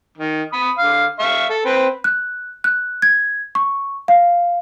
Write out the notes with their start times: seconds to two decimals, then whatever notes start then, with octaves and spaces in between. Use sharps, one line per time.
0.17 D#3
0.53 B5 D#6
0.79 D3 F5
1.19 E5 F5 C#6
1.50 A4
1.65 C4 B4
2.04 F#6
2.64 F#6
3.02 G#6
3.55 C#6
4.08 F5